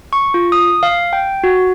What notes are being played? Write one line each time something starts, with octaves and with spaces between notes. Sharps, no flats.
C#6
F4
D#6
F5
G5
F#4